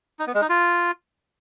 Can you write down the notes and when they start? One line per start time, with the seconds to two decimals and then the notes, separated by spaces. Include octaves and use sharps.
0.19 D#4
0.27 B3
0.34 G#3
0.42 D#4
0.49 F4